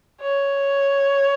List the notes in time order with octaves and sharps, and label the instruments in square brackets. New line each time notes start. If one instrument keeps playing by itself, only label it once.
[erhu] C#5